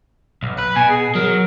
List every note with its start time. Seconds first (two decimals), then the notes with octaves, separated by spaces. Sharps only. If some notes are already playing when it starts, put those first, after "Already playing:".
0.43 B1
0.59 B4
0.76 B2 G#5
0.90 G#4
1.15 F#3 A#4